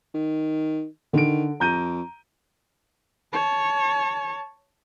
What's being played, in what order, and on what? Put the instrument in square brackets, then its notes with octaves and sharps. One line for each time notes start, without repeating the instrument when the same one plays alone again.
[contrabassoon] D#3
[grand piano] D3 D7 [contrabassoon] D#3
[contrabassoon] F2 [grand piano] A#5 G6 D#7
[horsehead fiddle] C#5 A5